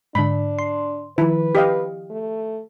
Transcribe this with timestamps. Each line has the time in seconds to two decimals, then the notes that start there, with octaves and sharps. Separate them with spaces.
0.15 G#2 D3 D4 B5
0.59 C6
1.18 D#3 F3 E4 B4
1.55 G4 D#5 F5
2.10 A3